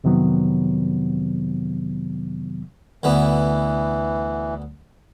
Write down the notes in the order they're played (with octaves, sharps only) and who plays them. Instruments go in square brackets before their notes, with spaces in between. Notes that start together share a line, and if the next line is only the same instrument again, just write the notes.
[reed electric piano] F2 C3 D#3 F#3 B3
[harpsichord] D2 D3 B3 [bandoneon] E3